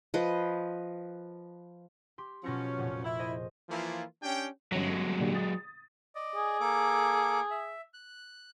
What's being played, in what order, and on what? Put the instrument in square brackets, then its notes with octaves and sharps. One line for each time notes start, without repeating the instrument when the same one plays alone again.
[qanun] F3 B4 D#5
[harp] G4 C6
[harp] B2 A#6 C#7 [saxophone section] F3 F#3 C#4
[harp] F1 A#2 F#4
[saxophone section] E4 [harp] F4
[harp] G#4 C5 D#5
[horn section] E3 F3 A#3 E4 F4
C#4 D4 G4 G5
[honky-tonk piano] G1 C#4 A#6 [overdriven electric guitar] F#3 G#3
[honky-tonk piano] A#2 D3 G3
D#6 A6
[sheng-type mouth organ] D5 D#5
[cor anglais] G#4
[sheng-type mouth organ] A#3 A4 D6
E5
F#6